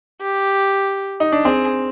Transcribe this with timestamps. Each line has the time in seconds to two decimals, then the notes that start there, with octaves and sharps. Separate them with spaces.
0.21 G4
1.20 D#4
1.32 D4
1.45 C4 G#4